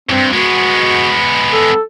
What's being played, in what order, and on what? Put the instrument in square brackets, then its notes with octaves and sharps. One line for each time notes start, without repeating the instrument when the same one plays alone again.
[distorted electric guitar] E2 G2 [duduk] C4
[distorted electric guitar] G#3 B3 [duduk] F#4
[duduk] A4